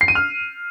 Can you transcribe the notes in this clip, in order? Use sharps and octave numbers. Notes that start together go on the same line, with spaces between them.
C7
D#7
F6